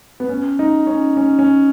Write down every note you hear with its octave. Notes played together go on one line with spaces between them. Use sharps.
B3
C#4
D#4
C#4
C#4
C#4